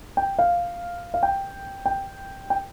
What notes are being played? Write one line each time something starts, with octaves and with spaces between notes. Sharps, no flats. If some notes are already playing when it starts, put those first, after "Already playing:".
G5
F5
F5
G5
G5
G5